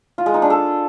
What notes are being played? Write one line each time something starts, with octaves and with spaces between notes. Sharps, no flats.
F4
G#3
D#4
D4
A4